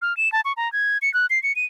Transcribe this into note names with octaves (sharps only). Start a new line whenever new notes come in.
F6
E7
A5
C#6
A#5
G#6
C#7
F#6
C7
C#7
D#7